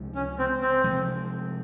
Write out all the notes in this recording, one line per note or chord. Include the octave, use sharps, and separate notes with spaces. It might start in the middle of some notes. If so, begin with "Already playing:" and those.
Already playing: C#2 C3 F3 G#3
C#4
C4
C4
C3 F3 G#3